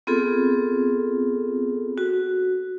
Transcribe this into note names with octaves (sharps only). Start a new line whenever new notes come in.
B3 C4 F4 G#4 A4
F#4